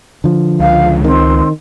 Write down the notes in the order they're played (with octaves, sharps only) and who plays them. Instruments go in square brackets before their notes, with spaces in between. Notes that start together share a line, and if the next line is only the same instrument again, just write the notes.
[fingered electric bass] D3 F3
[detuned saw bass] C#2 [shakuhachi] F5
[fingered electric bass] D#3 [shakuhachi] C4